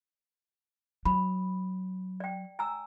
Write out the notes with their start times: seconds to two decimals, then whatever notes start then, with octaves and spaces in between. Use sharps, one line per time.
1.05 F#3 B5
2.20 D5 G5
2.59 G#5 A#5 E6